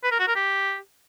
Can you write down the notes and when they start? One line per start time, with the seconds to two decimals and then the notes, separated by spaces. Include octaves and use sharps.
0.03 B4
0.11 A#4
0.19 F#4
0.28 A#4
0.36 G4